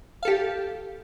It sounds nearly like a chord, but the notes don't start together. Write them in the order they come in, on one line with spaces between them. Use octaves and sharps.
F5 A4 G4